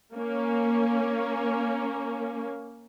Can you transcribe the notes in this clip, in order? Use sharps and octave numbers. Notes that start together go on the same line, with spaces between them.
A#3 C#4